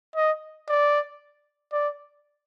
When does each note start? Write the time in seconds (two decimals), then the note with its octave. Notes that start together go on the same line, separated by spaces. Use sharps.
0.16 D#5
0.68 D5
1.72 D5